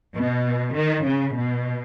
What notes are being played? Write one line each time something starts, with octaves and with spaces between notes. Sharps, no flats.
B2
D#3
C#3
B2